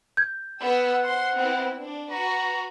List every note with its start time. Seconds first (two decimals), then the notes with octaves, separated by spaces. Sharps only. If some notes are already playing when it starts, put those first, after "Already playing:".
0.17 G6 G#6
0.59 B3 F#5 E6
1.03 C5 C6
1.36 B3 C4 E4
1.79 D4
2.11 F#4 B4 A#5